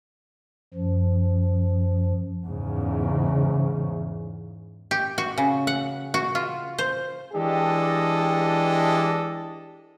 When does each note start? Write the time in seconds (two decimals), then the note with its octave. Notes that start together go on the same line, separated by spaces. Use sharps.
0.74 F#2 F3
2.45 E2 G#2 C#3
4.91 G4
5.18 F#4
5.38 C#3
5.67 F#5
6.14 F#4
6.35 F4
6.78 C5
7.34 E3 G#3 D4 G4 A4 D#5